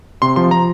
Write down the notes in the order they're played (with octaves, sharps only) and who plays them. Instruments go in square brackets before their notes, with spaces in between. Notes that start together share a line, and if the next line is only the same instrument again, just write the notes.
[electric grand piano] C3 C6
F3 C6
F3 A#5